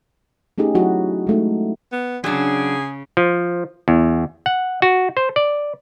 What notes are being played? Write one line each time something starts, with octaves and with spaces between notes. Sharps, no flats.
A3 C#4 D#4 G4 G#4
F#3 E4 F#4
G#3 A3 D#4
B3
C#3 F#3 D4 G#4
F3
E2
F#5
F#4
C5
D5